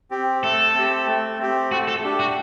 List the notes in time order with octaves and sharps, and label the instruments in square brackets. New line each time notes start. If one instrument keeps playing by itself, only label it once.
[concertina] C4 G4
[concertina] A3 [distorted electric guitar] A4
[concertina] C4 G4
A3
C4 G4
[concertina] A3 [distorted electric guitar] F#4
[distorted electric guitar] A4
[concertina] D4 G4
[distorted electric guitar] F#4